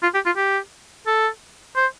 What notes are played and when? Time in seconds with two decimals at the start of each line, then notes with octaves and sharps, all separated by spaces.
0.03 F4
0.14 G4
0.26 F4
0.37 G4
1.07 A4
1.76 C5